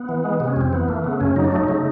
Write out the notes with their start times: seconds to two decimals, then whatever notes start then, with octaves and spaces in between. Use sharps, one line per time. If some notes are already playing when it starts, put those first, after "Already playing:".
Already playing: B3
0.09 E3
0.24 G#3
0.40 C3
0.47 C#4
0.56 F2 C4
0.73 E3 B3
0.88 A3 A#3
1.04 C#3 B3
1.20 F#2 C#4
1.36 F#3 D#4
1.45 D4
1.52 A3 D#4
1.68 C#3